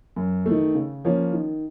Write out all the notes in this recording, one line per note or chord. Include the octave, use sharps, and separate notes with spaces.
F#2
D#3 A3
C#3
F3 A#3 C#4
D#3